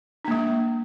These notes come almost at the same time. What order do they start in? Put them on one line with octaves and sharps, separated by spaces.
D4 A#3 G#3